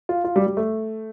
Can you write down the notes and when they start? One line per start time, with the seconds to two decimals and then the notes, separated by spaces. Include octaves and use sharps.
0.09 F4
0.24 F4
0.36 G3
0.47 G3
0.57 A3